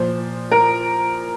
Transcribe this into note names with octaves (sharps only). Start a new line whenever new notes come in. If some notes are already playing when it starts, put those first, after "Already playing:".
Already playing: A#2 F3 C5
A#4